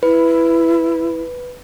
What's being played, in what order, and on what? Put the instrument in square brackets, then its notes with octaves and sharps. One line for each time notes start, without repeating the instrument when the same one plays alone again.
[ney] E4 [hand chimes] B4